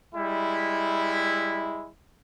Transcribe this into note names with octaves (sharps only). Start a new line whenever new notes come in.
G3 G#3 E4